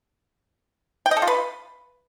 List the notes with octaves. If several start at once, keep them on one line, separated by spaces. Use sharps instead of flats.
G5
D#5
A4
F4
B4